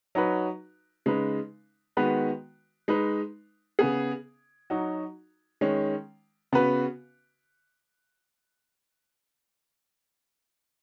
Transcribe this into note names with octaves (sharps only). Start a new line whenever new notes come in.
F#3 D#4 F#4 B4
C#3 G#3 D#4 B4
D#3 G#3 B3 F#4 B4
G#3 D#4 B4
C#3 B3 G#4
F#3 D#4 F#4
D#3 G#3 C#4
C#3 B3 F#4 B4